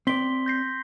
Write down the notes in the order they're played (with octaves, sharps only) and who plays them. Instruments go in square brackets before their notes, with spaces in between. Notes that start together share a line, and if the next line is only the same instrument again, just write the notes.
[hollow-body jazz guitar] C4 D5 [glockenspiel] C6 B6 G7
[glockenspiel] G6 A#6 C7